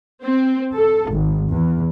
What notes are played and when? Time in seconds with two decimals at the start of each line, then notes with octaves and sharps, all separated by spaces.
0.23 C4
0.76 A4
1.11 G#1
1.51 E2